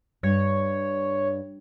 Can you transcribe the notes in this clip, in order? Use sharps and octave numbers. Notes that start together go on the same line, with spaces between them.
G2 C#5